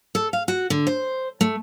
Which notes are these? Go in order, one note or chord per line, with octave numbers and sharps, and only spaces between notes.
A4
F5
F#4
D3
C5
A3